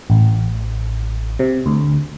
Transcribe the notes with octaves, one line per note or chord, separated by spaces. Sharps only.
A1
C3
D2